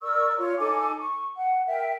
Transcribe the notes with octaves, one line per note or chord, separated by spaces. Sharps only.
A#4 D5 C#6 E6
F4 C#5
D#4 A4 G#5 D6
C#6
F#5
A#4 E5 G5